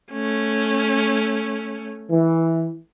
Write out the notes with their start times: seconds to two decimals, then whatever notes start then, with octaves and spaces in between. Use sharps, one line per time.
0.12 A3 C#4
2.10 E3